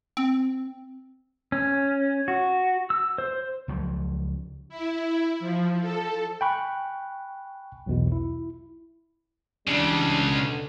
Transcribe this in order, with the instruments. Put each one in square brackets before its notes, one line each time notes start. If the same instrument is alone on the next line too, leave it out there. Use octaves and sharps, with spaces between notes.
[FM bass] C4
[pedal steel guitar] C#4
F#4
E6
C5
[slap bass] C#2 F3 F#3
[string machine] E4
F3
A4
[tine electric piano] G5 G#5 B5 C#6 F#6
B1 E2 B2
E4
[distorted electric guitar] C#2 C#3 [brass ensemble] E3 G3 D4
[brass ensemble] B2 D3